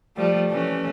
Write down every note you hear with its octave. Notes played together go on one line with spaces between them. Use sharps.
F3 G3 A3
E3 A3 C#4